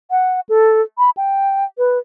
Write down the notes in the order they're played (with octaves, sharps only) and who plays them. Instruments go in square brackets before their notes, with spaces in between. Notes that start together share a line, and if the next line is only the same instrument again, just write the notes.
[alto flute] F#5
A4
B5
G5
B4